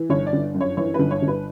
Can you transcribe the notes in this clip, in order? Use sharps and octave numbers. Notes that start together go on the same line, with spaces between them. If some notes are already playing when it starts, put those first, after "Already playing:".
Already playing: E3
G1 C#5
D5
G1
F#2
C#5
E3 C#5
B4
G1
C#5
G1
B4